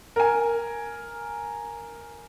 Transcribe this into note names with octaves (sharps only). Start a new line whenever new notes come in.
A#4 G#5